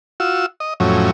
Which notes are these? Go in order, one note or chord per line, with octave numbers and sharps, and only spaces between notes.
F4 F#4 E6
D#5
F2 A2 F#3 C#4